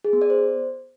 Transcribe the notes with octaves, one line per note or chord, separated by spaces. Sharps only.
G#4
B3
D5
C5